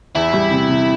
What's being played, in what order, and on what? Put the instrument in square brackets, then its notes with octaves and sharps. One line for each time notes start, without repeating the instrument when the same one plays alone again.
[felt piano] E2 [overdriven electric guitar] E4
[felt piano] G3
C3
C3